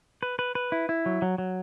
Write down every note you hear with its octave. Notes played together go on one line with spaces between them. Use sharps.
B4
B4
B4
E4
E4
F#3
F#3
F#3